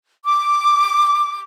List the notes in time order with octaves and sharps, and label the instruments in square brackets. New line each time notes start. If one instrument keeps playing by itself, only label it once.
[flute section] D6